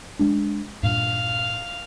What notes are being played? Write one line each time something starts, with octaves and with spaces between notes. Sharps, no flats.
G#3 D4
G2 A#2 F5